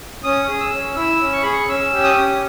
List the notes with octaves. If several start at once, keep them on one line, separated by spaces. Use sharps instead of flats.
C#4 D#6
G#4
E6
C#4
E4 E6
C#4
C#6
G#4 B5
C#6
C#4 E6
G4
D#6
C#4